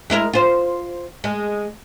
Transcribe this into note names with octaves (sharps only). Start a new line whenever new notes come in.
G#3 E4 A#4
F4 C5
G#3